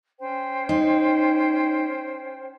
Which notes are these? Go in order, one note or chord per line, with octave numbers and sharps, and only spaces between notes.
C#4 C5 G5
D#4